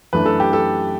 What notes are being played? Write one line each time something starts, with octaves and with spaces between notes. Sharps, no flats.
F#2 E3 A3 D4 B4
A4
G4
A4